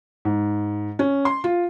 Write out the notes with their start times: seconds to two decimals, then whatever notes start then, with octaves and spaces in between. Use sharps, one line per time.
0.25 G#2
0.99 C#4
1.25 C6
1.44 F4